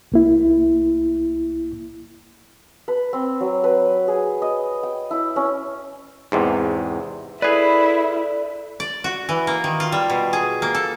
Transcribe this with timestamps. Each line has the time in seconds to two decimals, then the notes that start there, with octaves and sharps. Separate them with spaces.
0.12 C2 A#3 E4
2.88 B4
3.13 C4
3.41 F#3
3.64 B4
4.08 G#4
4.42 D#5
4.83 G5
5.11 E4
5.36 C#4
6.32 E2 G#2 C3
7.42 E4 G#4 A4 B4 D5
8.80 D5
9.04 F#4
9.29 E3
9.47 A#3
9.64 D#3
9.80 F4
9.92 G3
10.10 B2
10.33 G#4
10.62 A#3
10.75 A4